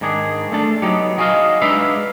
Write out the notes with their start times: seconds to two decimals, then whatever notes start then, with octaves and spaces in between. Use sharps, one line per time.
0.01 G#2 D#3 D4 G#4
0.52 A3 D4 A5
0.82 F#3 B3 D#4 G4
1.17 D#4 F#4 G#4 C#5 D#5 F5
1.62 G#3 D4 D#4 B4 E5 F5